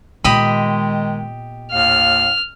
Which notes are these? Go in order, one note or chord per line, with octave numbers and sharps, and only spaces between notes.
A#2 D#3 G#3 B3 G4 D#5 B5
D#2 A2 F5 F6